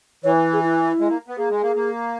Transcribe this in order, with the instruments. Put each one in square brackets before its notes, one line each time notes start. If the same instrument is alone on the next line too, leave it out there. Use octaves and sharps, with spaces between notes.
[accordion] E3 [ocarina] C#5
[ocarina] G#4
E4
[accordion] G#3
A#3
B3
[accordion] A#3 [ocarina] G#4
[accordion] G#3
A#3
A#3